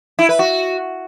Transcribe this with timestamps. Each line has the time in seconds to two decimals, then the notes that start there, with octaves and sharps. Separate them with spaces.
0.19 E4
0.29 B4
0.39 F#4